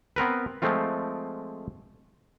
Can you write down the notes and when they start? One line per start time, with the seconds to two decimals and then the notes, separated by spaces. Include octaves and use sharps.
0.16 B3 C4 A#4 B4
0.62 F3 G#3 A3 C4 F4